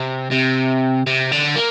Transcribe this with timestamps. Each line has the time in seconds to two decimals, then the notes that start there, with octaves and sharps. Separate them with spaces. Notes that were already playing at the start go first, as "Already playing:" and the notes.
Already playing: C3
0.32 C3
1.07 C3
1.32 D3
1.56 A#3